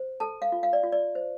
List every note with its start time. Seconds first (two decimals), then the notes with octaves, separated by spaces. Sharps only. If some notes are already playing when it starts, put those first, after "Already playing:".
Already playing: C5
0.20 A4 A5
0.42 F5
0.52 F4
0.63 F5
0.73 D5
0.83 F4
0.92 D5
1.15 C5